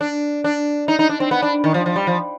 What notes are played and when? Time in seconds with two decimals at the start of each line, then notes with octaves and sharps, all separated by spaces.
0.01 D4
0.44 D4
0.88 D#4
0.99 D#4
1.09 D4
1.20 C4
1.31 B3
1.42 D4
1.64 D#3
1.74 F3
1.86 F3
1.96 G3
2.07 F3